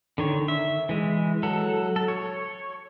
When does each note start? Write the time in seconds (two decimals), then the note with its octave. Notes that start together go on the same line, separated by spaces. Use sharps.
0.18 D3 D#3 C#5
0.48 E5
0.89 E3 G#3
1.43 F#3 A4
1.96 A4
2.08 C#5